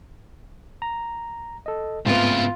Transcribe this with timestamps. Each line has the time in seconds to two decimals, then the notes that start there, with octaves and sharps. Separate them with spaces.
0.82 A#5
1.66 A4 D#5
2.06 G#2 C#3 A3 B3 C4 E4 F4